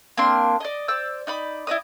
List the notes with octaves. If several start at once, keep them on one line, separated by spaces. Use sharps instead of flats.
A#3 C4 D4 C6
D5 D#5
C5 D5 E6
D#4 D5 B5
E4 D5 D#5 D#6